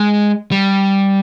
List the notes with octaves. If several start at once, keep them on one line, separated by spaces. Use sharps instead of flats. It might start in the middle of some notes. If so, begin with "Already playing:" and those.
Already playing: G#3
G3